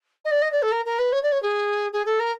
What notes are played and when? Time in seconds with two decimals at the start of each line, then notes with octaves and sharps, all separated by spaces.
0.25 D#5
0.31 D5
0.42 D#5
0.52 D5
0.62 A4
0.71 A#4
0.85 A#4
0.98 B4
1.12 C#5
1.23 D5
1.32 C#5
1.42 G#4
1.92 G#4
2.05 A4
2.19 A#4